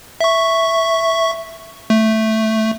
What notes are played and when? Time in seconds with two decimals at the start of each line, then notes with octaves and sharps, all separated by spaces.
0.21 E5 C#6
1.90 A3